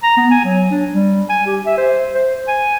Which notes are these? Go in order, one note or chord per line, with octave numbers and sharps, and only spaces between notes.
A#5
B3
G#5
F#3
D4
G3
G#5
G4
E5
C5
C5
G#5